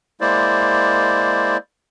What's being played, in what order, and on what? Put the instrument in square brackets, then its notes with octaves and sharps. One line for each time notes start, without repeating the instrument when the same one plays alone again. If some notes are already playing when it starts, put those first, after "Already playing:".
[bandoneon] G#3 A#3 E4 C5 D5